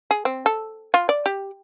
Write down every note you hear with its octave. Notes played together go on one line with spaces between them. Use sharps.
G#4
C4
A4
F4
D5
G4